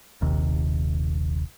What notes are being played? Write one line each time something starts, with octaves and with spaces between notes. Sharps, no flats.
D#1 A#1 D#2 C3